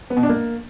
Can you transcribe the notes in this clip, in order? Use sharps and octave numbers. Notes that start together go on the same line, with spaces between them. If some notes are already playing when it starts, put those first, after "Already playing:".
B3
B2
D4
A#3